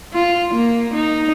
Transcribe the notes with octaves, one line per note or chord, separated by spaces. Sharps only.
F4
A#3
D#4